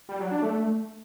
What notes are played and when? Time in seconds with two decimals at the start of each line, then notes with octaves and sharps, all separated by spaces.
0.09 G3
0.20 F#3
0.31 D4
0.42 A3